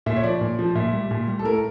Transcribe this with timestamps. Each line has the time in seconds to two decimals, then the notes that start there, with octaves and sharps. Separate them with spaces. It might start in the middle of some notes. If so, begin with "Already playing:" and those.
0.06 A#2 E5
0.16 C#5
0.24 F3 D5
0.41 A#2
0.59 F3
0.75 A#2 E5
0.93 G3
1.11 A#2
1.28 G3
1.39 A4
1.45 A2 A#4